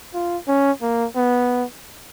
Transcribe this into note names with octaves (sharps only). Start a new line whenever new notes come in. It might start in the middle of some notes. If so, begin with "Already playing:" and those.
F4
C#4
A#3
B3